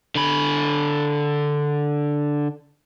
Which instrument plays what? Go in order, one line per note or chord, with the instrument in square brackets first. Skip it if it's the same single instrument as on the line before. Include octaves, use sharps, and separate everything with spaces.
[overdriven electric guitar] D3 B5